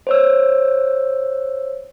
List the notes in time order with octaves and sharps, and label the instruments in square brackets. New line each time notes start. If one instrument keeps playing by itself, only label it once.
[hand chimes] C5 C#5 E6